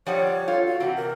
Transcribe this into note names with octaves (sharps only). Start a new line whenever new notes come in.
F3 G3 C#5 F#5
F4 A4
F#4
C3 E3 F#5
A#4